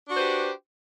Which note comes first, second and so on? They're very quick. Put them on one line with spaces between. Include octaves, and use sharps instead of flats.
D4 F#4 C5 B4 G4